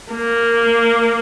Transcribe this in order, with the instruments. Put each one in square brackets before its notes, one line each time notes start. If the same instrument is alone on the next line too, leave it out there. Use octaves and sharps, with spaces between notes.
[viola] A#3